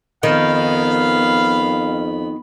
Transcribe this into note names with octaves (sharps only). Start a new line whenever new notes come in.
F2 D#3 B3 F5 B5